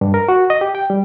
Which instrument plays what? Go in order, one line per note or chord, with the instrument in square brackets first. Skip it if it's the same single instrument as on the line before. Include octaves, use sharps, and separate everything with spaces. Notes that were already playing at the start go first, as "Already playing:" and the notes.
[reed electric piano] G2
A#4
F#4
D#5
G4
G5
G3